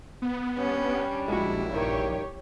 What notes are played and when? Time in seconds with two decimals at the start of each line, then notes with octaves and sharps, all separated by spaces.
0.22 B3
0.58 G3 C#4 D4
1.28 A#1 G#3 E4 F#4
1.72 G2 D#3 G4 C#5